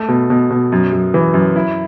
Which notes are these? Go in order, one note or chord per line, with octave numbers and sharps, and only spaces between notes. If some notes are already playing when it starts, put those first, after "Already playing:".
Already playing: A3
B2
B2
B2
F#2
F#2
E3
F#2
E4